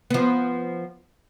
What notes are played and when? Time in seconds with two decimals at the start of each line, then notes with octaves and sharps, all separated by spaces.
0.10 F3 B3